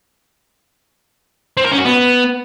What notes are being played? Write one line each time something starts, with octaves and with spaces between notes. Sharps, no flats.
C4
A#4
C#4
F#4
B3